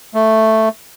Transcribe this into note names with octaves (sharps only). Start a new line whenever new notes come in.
A3